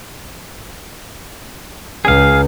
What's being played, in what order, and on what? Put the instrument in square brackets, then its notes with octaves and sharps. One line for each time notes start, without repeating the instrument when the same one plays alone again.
[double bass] C#2 [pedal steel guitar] G#4 F5